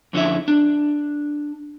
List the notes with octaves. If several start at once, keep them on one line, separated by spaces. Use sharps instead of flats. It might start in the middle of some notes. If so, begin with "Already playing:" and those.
F2 D3 C#4 E4 E5
D4